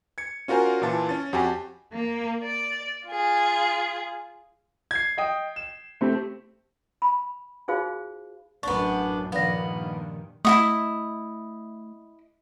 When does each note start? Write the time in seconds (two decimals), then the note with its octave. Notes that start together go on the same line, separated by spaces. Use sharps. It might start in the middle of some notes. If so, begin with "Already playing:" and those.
0.18 G#6 C#7
0.48 C#4 F4 F#4 A#4 C5 G#5
0.82 A#2 E3 F4 A5
1.09 C#4 A6
1.33 F2 F#4 G4 G#5 A5
1.93 A#3
2.43 D5
3.07 F4 G#4
4.91 G#6 C7
5.17 D#5 G5 D#6
5.56 E7
6.01 A3 C4 G4
7.02 B5
7.68 D#4 F4 F#4 G#4 C5 F5
8.63 A1 F#2 B3 D4 C#6
9.32 G2 A#2 D#3 F3 B3 D5 A#6
10.45 A3 E4 F#4 D#5